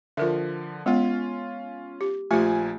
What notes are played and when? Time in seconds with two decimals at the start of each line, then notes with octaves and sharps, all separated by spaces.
0.17 D3 F3 F4 A#4 E5
0.86 G#3 B3 C#4 F4
2.01 G4
2.31 A#1 F3 A3 F4 G4 G#5